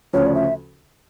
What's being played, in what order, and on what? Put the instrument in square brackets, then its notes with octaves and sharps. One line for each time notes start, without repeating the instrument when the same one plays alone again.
[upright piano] D2 C#3 F3 C#4 [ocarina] C#5
[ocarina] D5
E5